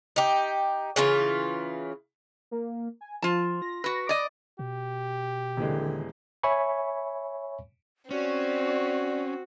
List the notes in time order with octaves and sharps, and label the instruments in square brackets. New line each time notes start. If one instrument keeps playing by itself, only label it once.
[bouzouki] D#4 G4
C#3 E3 F4
[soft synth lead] A#3
G#5
[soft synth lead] F3 [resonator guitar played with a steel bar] F4 A5
[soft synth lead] A#6
[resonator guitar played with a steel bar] F#4 B4
D5 D#5
[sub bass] B2 [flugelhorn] G4
[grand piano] D#1 E3 G#3 [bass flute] D3
[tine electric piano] C#5 E5 G#5 B5 C#6
[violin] C4 [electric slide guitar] C#4 [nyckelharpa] F#4 [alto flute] D5